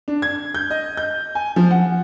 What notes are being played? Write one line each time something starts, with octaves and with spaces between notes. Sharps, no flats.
D4
G#6
G6
D#5
G6
G#5
F3
F#5